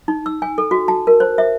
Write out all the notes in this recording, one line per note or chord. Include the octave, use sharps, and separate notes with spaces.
D#4
E6
G#5
A4
F#4
A5
A#4
C5
E5